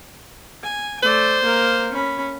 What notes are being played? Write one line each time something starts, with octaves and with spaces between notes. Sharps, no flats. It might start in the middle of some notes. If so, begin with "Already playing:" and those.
G#5
A3 C5 D5
A#3 A#4
C#4 B5